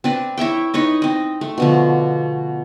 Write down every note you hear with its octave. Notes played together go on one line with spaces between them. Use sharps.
C4 D4 B4
E4 C#5 E5 G5
D#4 B4 C#5 D#5
C4 D#5
A3
B2 D3 F3